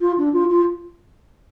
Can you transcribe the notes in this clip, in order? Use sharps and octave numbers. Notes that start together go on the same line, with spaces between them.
F4
D4
F4
F4